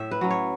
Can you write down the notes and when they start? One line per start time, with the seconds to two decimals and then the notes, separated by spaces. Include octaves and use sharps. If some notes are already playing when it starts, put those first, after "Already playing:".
Already playing: A2 E5
0.11 B4
0.21 F#3 C#4
0.31 C#5